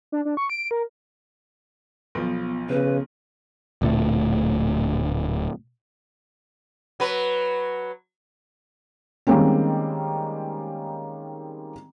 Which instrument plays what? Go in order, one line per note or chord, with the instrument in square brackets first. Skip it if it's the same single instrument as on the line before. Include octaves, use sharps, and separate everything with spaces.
[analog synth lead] D4
D4
C#6
D7
A#4
[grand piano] B1 F3 [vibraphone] B3
[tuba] C#3 [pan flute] B4
[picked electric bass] D1 D2 A#2 A3
[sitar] F#3 B4
[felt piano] D#3 G3 G#3 A#3 C4 C#4